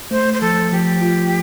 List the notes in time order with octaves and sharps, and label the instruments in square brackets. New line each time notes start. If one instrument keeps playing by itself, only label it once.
[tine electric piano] A3 [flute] C5
[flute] C5
[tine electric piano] F3 [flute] A4
[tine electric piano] F3 [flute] G4
[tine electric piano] F4